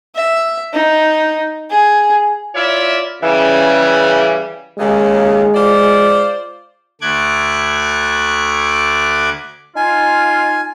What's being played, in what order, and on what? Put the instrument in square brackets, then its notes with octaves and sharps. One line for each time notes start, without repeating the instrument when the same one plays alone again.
[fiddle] E5
D#4
G#4
[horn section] E4 F4 A#4 C#5 D5 E5
C#3 E3 G3
[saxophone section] D#2 C#3 [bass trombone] G#3
[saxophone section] F4 C5 D5
[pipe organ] D2 A3 D6 F#6 G#6
[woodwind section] D#4 F4 [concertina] G#5